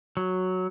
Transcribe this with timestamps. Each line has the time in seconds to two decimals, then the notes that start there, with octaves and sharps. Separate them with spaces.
0.17 F#3